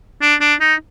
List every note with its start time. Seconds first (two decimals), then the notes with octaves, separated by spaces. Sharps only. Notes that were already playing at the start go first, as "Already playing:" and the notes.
0.22 D4
0.41 D4
0.61 D#4